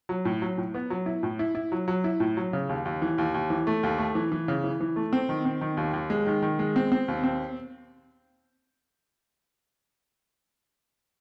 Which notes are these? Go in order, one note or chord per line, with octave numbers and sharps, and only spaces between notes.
F#3
A2
F#3
A2
B3
F#3
E4
A2
E4
E4
F#3
F#3
E4
A2
F#3
C#3
D#2
D#2
E3
D#2
D#2
E3
A3
D#2
A3
E3
E3
C#3
E3
E3
A3
C4
D#3
C4
D#3
D#2
D#2
G#3
D#3
D#3
G#3
C4
C4
D#2
C4